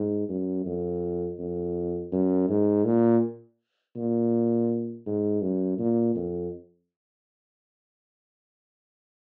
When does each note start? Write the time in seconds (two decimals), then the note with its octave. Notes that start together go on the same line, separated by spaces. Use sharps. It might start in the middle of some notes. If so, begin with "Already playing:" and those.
Already playing: G#2
0.29 F#2
0.66 F2
1.39 F2
2.12 F#2
2.49 G#2
2.85 A#2
3.96 A#2
5.06 G#2
5.42 F#2
5.79 A#2
6.16 F2